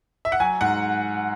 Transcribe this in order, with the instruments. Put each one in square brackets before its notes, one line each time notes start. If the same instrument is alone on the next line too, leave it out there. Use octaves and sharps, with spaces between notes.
[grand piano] E5
F#5
F#3 G#5
G#2 F#5